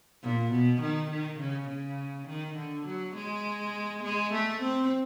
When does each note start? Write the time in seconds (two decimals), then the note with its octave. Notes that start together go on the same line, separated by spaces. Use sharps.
0.22 A#2
0.52 B2
0.81 D#3
1.11 D#3
1.40 C#3
1.69 C#3
2.28 D#3
2.57 D3
2.86 F#3
3.15 G#3
4.04 G#3
4.33 A3
4.62 C4